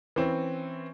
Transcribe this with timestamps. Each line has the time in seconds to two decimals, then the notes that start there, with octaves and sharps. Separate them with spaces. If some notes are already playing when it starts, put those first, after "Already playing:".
0.16 E3 C4 C#4